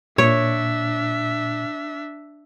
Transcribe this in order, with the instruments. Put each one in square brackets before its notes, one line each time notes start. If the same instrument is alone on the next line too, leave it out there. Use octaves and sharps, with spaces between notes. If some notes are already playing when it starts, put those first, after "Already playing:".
[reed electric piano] A#2 [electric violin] D4 E5 [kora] C#5